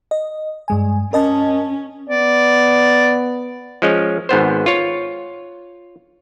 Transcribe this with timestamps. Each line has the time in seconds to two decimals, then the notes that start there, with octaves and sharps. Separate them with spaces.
0.11 D#5
0.68 G2 G#3 G#5
1.13 C#4 A#4 D#5 A5
2.10 B3 D5
3.82 F3 G#3 C#4
4.29 G#1 G#2 B3 C5
4.66 F4 C#5